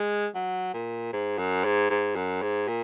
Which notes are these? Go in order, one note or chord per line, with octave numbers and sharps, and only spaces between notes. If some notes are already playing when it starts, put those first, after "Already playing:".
Already playing: G#3
F#3
A#2
G#2
F#2
G#2
G#2
F#2
G#2
A#2